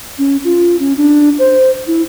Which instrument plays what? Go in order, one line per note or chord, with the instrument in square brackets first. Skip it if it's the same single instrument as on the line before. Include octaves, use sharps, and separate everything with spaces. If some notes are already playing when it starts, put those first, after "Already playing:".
[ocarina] C#4
F4
C#4
D4
C5
E4